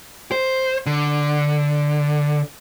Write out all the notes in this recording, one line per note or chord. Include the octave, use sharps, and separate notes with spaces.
C5
D3